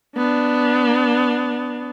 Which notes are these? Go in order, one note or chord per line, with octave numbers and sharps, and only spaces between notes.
B3 D4